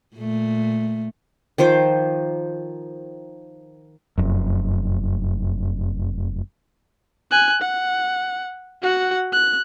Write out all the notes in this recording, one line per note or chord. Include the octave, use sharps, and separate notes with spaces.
A#2 A3
D#3 F3 C5 D6
F1 F#2
G#5 F#6
F#5
F#4 F#5
F#6